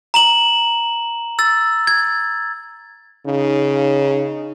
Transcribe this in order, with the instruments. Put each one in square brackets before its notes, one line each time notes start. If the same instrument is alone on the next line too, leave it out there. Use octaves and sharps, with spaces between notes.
[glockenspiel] A#5 E7 F#7
E6 A6
G#6
[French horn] C#3 [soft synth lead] D#4